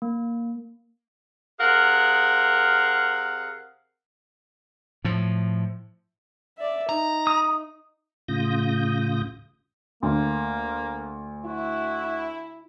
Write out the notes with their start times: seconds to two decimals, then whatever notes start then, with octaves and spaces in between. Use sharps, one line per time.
0.02 A#3
1.60 C3 G#4 A#4 F5 F#5
5.05 A2 F3
6.58 D5 E5
6.89 D#4 A#5
7.27 D#6
8.28 A2 C#3 F4 D#6 G6 A#6
10.03 D2 A#3
11.45 E4 F#4